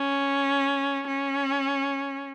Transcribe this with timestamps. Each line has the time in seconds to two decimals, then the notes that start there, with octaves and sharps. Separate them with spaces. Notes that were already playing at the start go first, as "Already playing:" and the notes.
Already playing: C#4
1.07 C#4